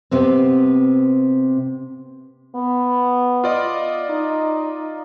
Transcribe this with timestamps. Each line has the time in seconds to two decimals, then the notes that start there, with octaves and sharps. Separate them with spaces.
0.11 C3 B3 C4
2.55 B3
3.44 F4 D5 D#5
4.10 D#4